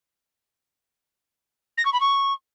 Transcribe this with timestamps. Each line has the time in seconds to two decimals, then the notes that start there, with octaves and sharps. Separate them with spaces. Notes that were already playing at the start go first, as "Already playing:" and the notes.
1.77 A#6
1.85 C#6
1.93 B5
2.00 C#6